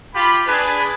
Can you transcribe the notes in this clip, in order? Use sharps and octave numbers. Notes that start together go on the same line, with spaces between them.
F4 G4 B5
D4 G#4 B4